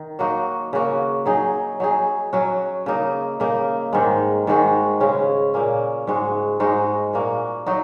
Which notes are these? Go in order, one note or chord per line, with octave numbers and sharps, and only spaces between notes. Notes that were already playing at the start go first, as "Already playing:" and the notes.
Already playing: D#3
F#3 A#3 D#4 F#4
C#3 A#3 F#4
F#3 D#4 G#4
F#3 D#4 G#4
F#3 C#4 F#4
C#3 A#3 D#4
C#3 A#3 D#4
G#2 D#3 G#3
G#2 D#3 G#3 F#4
C#3 G#3 C#4
A#2 A#3 C#4
G#2 G#3 F#4
G#2 G#3 D#4 F#4
A#2 A#3 F#4
F#3 D#4 F#4